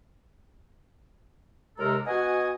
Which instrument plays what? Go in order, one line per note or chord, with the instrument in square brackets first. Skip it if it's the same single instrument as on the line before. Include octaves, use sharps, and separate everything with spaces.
[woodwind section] D#2 C3 G#3 A4 A#4 A#5
B2 F#4 D#5 F#5 G#5